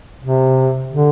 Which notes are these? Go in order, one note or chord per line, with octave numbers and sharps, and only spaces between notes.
C3
D3